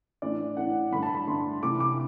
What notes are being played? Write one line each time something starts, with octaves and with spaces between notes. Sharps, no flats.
A2 E3 A3 D4 D5
A2 E3 A3 D4 F#5
G2 D3 A3 D4 B5
A5
B5
G2 D3 A3 D4 C6
C3 E3 A3 D4 D6
D6